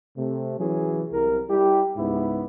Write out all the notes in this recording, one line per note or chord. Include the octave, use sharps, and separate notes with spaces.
C3 A3
E3 F#3 C#4 G#4
C2 A#4
G3 E4 G4
C#2 G#2 B3 E4